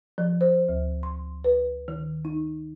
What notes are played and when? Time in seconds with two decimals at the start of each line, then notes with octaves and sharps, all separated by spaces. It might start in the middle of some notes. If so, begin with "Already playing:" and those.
0.18 F3
0.41 C5
0.69 D2
1.03 C6
1.44 B4
1.88 D#3
2.25 D#4